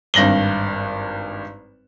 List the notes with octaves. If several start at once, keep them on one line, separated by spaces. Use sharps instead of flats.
G#1 G2 A#6 F#7 G7